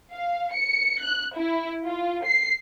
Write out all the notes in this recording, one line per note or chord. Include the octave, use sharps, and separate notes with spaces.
F5
C#7
F#6
E4
F4
C7